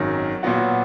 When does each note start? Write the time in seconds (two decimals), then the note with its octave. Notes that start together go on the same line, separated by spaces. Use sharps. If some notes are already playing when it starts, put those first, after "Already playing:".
Already playing: G#1 F#2 D#3 F#3
0.43 A#2 F#3 B3 F#4